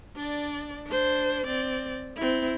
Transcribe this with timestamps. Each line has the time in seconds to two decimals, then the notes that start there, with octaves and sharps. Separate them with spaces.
0.16 D4 D5
0.87 D4 C5
1.47 C4 D5
2.17 C4 E4